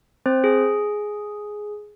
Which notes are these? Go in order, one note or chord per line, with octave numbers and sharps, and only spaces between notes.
C4 C5
G#4